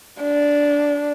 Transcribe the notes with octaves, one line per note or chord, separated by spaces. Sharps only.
D4